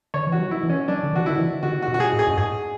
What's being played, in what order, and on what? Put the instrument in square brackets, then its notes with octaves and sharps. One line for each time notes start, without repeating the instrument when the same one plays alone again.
[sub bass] D3 [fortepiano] C#5
[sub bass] E3
[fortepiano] F#4
[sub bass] F#3
[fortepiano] E4
[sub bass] E3
[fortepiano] C#4
[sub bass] F#3 [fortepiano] D4
[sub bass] D3
[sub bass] E3 [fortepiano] F#4
[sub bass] D3 [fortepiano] E4
[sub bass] E3
[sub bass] D3 [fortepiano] F#4
[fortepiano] F#4
[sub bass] B2
[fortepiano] F#4
G#4
[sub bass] A2
[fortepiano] G#4
[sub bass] F#2
[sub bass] G#2 [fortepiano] G#4